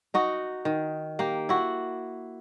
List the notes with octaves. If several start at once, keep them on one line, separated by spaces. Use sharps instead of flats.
D#4 F#4 D#5
D#3
A#3 G4
E4 F#4